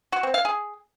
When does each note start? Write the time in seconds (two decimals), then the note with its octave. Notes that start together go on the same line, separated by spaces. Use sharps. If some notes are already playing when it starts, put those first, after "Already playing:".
0.12 F#4
0.23 C4
0.34 F5
0.45 G#4